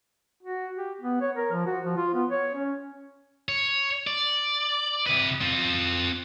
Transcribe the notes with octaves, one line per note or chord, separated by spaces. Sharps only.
F#4
G4
B3
C#5
A#4
F3
F#4
F3
F4
B3
C#5
C#4
C#5
D5
C3 B4
C4 F4